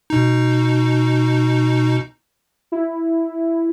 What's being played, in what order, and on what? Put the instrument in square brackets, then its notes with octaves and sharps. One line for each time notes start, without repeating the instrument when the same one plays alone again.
[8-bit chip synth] B2 D#4
[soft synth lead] E4